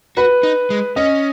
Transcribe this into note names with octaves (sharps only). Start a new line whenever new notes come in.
F#4 B4
D#4
G#3
C#4 D#5